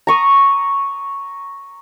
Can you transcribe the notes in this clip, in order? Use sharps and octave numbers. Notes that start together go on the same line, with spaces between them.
A#5 C#6 D#6